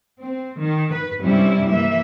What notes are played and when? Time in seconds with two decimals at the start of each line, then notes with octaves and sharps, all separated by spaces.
0.20 C4
0.58 D#3
0.93 B4
1.21 G2 C3 G3 C#4 E4
1.70 E3 A#3 E5